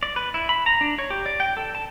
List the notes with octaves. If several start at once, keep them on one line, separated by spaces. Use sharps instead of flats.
D5
B4
E4
B5
A#5
D4
C#5
G4
D5
G5
A4
A5